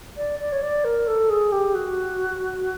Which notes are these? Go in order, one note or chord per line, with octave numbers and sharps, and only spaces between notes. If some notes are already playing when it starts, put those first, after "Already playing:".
D5
D5
C#5
D5
A#4
A4
G#4
G4
F#4